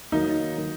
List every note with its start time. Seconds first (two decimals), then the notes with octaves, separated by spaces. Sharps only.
0.12 D#3 F#3 A#3 D#4